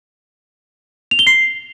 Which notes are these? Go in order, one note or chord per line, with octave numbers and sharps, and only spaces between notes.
F7
G7
C7